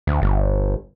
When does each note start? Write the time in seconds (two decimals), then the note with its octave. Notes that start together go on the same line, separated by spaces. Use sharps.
0.07 D2
0.22 G1